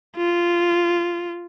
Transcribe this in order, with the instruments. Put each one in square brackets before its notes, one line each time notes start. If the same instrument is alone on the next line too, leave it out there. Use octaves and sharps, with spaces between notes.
[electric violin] F4